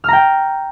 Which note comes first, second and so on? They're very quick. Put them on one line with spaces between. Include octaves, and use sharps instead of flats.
F6 A#5 G5